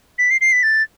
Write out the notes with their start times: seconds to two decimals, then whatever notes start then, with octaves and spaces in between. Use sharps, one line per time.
0.18 B6
0.30 C7
0.41 C7
0.52 B6
0.63 A6